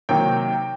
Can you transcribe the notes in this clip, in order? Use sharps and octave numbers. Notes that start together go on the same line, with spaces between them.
C3 D#3 F#3 A#3 G5